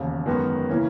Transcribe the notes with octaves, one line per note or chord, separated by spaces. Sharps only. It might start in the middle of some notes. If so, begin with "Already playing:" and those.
Already playing: E1 D#2 C#3
F#2 D#3 G#3 B3 F#4
C#3 E3 A#3 C#4